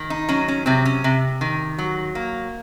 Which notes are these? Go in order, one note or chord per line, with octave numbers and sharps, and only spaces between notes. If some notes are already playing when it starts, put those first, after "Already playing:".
Already playing: D#3
D#4
F#3 C#4
C#4
C3 C4
C#4
C3
D#3
F#3
A#3